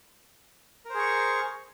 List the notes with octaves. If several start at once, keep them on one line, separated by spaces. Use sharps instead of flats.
G#4 A#4 C5 C#6